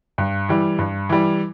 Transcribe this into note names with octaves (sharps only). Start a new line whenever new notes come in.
G2
E3 G3
G2
E3 G3